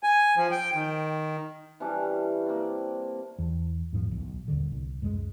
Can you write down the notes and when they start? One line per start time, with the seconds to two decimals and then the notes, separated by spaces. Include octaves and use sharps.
0.03 G#5
0.37 F3
0.51 G5
0.74 D#3
1.80 E3 G3 C#4 D4
2.46 A#3 C4 D5
3.39 E2
3.93 E2 G#2 C#3 F3
4.08 D1 B1
4.48 D#1 G#1 D3
4.72 C2
5.02 C#2 F#2 F3 G#3